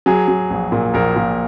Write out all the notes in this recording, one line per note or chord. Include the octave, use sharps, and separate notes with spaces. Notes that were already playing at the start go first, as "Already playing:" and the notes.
F#3 G#4
F#3
A#1
A#2
A#1 A#4
A#2